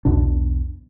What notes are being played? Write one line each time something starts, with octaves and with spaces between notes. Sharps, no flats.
B1 E2 B2 D4